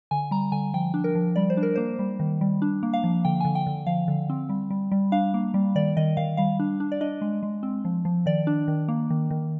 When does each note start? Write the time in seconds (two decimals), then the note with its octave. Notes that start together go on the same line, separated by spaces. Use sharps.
0.11 D3 G#5
0.31 G3 A#5
0.52 D3 G#5
0.74 F3 G5
0.94 D4
1.04 A#4
1.15 F3
1.36 G3 D5
1.50 C5
1.57 D4
1.63 A#4
1.75 A#3 C5
1.99 G3
2.20 D#3
2.41 G3
2.62 D4
2.83 A#3
2.94 F5
3.04 F3
3.25 D3 G5
3.40 G#5
3.45 D3
3.55 G5
3.66 D3
3.86 F3 F5
4.08 D3
4.29 C4
4.49 G3
4.70 G3
4.92 G3
5.12 D4 F5
5.34 A#3
5.54 G3
5.76 D#3 D5
5.97 D#3 D#5
6.17 D#3 F5
6.37 G3 F5
6.59 D4
6.80 D4
6.92 D5
7.01 D4 D#5
7.21 G#3
7.43 G#3
7.63 C4
7.85 F3
8.05 F3
8.26 D#3 D5
8.47 D4
8.68 D#3
8.88 A#3
9.10 D#3
9.31 D#3